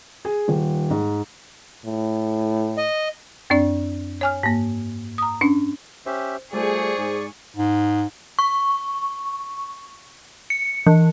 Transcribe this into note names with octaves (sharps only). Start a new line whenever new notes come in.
G#4
D#1
G#2
A2
D#5
F#2 C4 D4 D5
C#5 G#5 F6
G#2 A#3
A#5 D#6
C#4 D4
C#4 G4 C5 E5
G3 A3 F4 G#4 C5 D5 C#6
G#2
G#2
C#6
C#7
E3